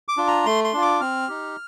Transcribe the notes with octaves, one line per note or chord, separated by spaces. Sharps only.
D6
D4 F4
A#5
A3 C6
C6
D4 F4
D6
C4 F6
D#4 G4